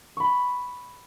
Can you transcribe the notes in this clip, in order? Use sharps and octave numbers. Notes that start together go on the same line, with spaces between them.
B5 C#6